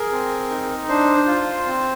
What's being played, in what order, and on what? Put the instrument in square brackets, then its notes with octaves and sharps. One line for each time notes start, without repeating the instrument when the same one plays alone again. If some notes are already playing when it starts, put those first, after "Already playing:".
Already playing: [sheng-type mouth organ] G#4 A#4
C4
D#4
D4 C5
F4
C4